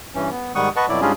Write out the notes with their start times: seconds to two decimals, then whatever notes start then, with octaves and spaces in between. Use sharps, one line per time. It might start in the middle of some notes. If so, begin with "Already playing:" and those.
0.15 G2 E3 C#4
0.31 B3
0.55 G#2 D#3 G3 F#5 C#6 D#6
0.76 B4 D#5 F#5 A5 C#6
0.89 F2 B2 F#3 E4 D5
1.01 G#2 G3 C#4 D4 F4 G#4